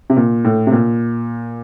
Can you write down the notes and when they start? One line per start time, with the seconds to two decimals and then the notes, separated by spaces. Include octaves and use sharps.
0.10 C3
0.17 A#2
0.45 A2
0.67 C3
0.72 A#2